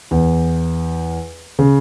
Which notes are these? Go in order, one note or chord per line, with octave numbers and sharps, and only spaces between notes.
E2
C#3